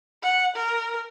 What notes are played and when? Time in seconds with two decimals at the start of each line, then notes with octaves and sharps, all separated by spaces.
0.23 F#5
0.56 A#4